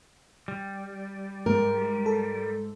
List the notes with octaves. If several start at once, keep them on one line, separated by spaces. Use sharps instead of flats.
G3
G#2 A#4
A4